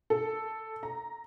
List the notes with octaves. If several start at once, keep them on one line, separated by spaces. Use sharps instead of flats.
A4
A#5